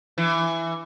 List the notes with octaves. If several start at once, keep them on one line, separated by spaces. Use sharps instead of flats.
E3